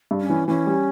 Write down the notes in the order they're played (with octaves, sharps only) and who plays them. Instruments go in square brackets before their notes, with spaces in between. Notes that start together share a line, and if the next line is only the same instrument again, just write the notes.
[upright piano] G2
[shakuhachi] C#4
[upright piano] E3
[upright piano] E3 [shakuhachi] C#4
[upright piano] G3